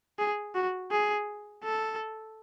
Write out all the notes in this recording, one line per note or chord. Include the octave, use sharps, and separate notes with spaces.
G#4
F#4
G#4
A4